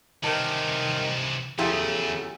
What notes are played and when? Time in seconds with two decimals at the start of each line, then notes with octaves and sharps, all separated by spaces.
0.23 C3 D#3 E3 A5
1.59 E2 C#3 F3 F#3 A3 E4 G4